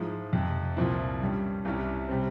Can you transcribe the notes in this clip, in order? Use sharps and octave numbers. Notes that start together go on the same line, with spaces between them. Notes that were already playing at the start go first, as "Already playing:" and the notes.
Already playing: G#2 F3 G#3 E4
F2 C3 F3
C2 A#2 F3 C4 E4
G2 G3 C#4
C2 C3 G3 C#4 E4
C3 G3 C4